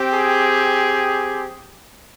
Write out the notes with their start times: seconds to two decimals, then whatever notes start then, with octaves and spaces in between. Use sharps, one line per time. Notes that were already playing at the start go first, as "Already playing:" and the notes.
Already playing: C4 G4
0.13 G#4